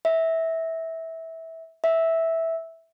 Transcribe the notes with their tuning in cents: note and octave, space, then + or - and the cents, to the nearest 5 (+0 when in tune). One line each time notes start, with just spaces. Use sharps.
E5 -15
E5 -10